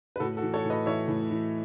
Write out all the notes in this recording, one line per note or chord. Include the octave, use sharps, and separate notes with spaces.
B4
A2 F#4 A4
F#4 A4
E3
A4 C#5
A2
B4 D#5
E3 C#5 E5
A2
E3